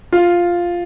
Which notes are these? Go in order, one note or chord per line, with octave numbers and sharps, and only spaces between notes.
F4